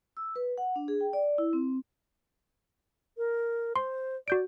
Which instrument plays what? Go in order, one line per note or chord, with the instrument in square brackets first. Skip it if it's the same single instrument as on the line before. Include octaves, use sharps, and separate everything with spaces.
[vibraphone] E6
B4
F#5
D4
G#4
G5
D5
E4
C4
[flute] A#4
[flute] C5 [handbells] C6
[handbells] F#4 G6 D7 [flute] D5